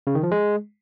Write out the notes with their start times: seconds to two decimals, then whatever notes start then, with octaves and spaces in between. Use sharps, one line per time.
0.07 C#3
0.15 D#3
0.23 F3
0.31 G#3